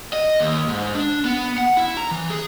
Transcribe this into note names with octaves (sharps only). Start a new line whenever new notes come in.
D#5
D#2
G#2
D4
B3
F#5
E4
A#5
E3
G#4